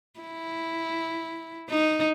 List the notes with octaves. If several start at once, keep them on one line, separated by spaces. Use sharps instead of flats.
E4
D#4